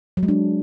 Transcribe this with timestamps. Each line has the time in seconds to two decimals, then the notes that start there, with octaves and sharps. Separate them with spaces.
0.17 F#3
0.23 G#3
0.28 D4